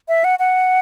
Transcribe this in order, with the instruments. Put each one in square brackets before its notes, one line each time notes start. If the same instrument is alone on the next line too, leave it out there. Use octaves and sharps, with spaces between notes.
[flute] E5
F#5
F#5